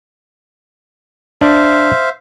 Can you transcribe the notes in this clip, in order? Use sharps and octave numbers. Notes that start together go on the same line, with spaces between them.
D4 C5 E5 F5